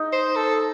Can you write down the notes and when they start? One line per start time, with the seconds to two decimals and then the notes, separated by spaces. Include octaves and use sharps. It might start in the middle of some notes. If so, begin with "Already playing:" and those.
Already playing: D#4
0.13 C5
0.36 A4